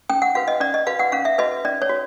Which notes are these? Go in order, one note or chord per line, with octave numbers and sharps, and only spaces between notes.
C#4 G5
F#5
F#4 B4 F5
D#5
C#4 D5
D#5
F#4 B4 F5
F#5
C#4 F5
E5
F#4 B4 D#5
C#4 D5
C#5
F#4